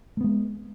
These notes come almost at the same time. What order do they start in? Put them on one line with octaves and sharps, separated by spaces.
A3 B3 G#3